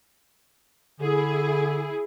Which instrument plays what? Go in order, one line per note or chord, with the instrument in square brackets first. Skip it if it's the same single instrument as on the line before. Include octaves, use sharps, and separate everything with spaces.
[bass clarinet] D3 [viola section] E4 G#4